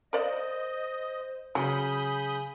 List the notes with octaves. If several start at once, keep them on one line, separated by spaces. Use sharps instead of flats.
A#4 C5 D5 D#5 F5
C#3 F#3 G#5 B5 D#6 G6